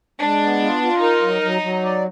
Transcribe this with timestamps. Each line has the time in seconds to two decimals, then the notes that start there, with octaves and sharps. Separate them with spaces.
0.21 G#3 D4
0.41 B3
0.62 F4
0.81 F4
1.02 D#4 A#4
1.22 F#3
1.42 F#3
1.62 F#3
1.83 D5